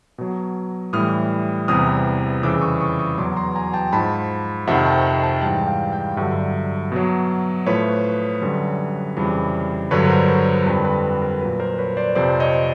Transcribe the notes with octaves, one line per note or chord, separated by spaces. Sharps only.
B2 F#3
A2 E3 G3 D#6 F6
E2 C3 E3 G3 D#6 F6
F2 C#3 E3 G3 D6 E6
C#6 D#6
C#6 D#6
C#6 D#6
E2 B2 F#3 C6 D6
A#5 C6
G#5 A#5
G5 A5
G#2 F3 A5 B5
F2 C3 D#3 E5 F#5
G5 A5
G5 A5
G#2 E3 G3 G5 A5
F5 G5
F5 G5
G2 D3 F#3 E5 F#5
B2 F#3
A2 F3 B4 C#5
F#2 D3 G3
F2 C#3 E3 G3
G2 D3 F#3 B4 C#5
B4
A#4 C5
B4
A#4
F2 D3 G3 B4
B4
A#4
A#2 F#3 B4
A#4 C5
B4 C#5
C5 D5
F2 C3 F3 C5 D5
C#5 D#5